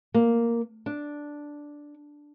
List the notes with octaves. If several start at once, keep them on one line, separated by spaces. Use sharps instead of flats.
A#3
D4